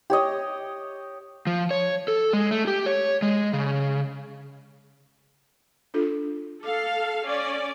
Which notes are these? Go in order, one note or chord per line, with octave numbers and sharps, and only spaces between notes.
G4 C#5 D#5
F3
C#5
A4
G#3
A3
G4
C#5
G#3
C#3
D4 F4 A4
A4 F5 D6
C#4 D5